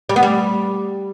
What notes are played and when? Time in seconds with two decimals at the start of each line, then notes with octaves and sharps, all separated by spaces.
0.09 G3
0.16 B3
0.23 G3